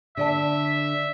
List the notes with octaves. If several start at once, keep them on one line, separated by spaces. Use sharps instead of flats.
D3 D5 E5 A5